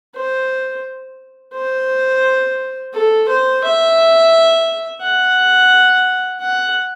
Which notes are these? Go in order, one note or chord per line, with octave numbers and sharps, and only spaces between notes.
C5
C5
A4
C5
E5
F#5
F#5